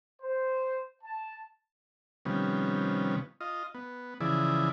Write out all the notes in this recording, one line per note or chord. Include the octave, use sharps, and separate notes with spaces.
C5
A5
C3 D#3 F3 G3 B3 C#4
F4 D#5
B3
C#3 E3 F3 E4 G#4 D5